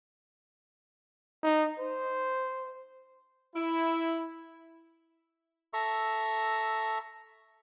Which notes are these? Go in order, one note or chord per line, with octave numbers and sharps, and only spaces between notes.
D#4
C5
E4
A4 E5 A#5 C#6